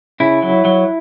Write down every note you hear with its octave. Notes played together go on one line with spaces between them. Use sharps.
C#3 E4
F#3
F#3